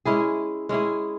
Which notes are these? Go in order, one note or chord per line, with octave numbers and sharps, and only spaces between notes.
G#3 C#4 E4 G#4
G#3 C#4 E4 G#4